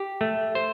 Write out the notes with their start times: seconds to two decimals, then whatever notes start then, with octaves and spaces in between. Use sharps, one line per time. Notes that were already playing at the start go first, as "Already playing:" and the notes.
Already playing: G4
0.21 A3
0.55 C5